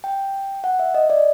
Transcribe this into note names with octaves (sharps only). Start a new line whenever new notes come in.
G5
F#5
E5
D#5
D5